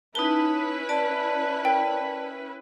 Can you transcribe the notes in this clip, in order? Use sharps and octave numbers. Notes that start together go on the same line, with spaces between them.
C#4 D#4 E4 B4 A5 G7
D5 A5
A#4 G5